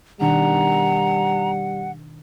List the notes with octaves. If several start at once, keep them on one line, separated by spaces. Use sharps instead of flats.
B2 D#3 G3 D4 F#5 A#5